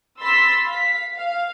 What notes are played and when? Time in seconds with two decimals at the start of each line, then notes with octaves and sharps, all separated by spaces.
0.19 B5 C6 E6 A6 B6
0.66 F5 B6
1.16 F5